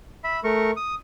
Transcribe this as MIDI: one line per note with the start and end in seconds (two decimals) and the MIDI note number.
0.24 0.40 76
0.24 0.40 83
0.44 0.71 57
0.44 0.71 70
0.44 0.71 85
0.77 0.95 87